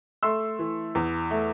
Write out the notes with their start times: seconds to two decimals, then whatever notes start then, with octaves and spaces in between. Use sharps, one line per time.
0.23 A3 C6 E6
0.59 E3
0.95 E2
1.31 A3